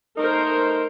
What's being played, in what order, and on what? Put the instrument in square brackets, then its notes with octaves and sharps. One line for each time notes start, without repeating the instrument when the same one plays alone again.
[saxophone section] A3 D#4 [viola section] A#4 C5